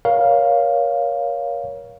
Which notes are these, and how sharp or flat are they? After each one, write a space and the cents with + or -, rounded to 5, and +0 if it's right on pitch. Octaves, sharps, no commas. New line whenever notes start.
A#4 +30 C#5 +15 F5 +0